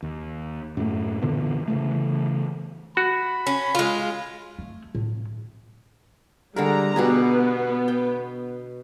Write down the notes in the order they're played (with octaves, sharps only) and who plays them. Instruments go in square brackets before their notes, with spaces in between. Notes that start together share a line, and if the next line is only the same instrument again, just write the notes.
[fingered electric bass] D#2
F#2 A2 A3
A#2 D3 E3 B3
C#3 E3 A3
[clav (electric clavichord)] F#4 [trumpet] B5
[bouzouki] C#4
G#3 F4
[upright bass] A3
A2
[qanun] D3 G#3 A#4 [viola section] G3 A#5
[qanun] B2 G4 G#4 [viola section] B3
[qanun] G5